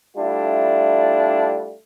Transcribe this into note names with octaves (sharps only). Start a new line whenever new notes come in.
G3 A3 D4 E4 F4